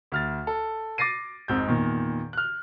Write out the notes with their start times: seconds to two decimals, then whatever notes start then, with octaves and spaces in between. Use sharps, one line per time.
0.12 D2 F6 A6
0.47 A4
0.98 D6 A6 A#6 C7 D#7
1.48 G#1 F2 G#2 E6 G6
1.67 E2 A#2 D#3
2.33 F6 F#6